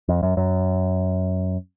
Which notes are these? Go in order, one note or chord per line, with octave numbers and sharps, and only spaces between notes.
F2
F#2
F#2